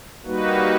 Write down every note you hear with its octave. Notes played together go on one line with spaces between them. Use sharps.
G3 A#3 D#4 F#4 B4